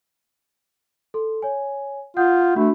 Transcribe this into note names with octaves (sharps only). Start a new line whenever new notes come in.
A4 C6
C#5 G#5
F4 F#5 D#6 G6
A3 D4 F#4 B5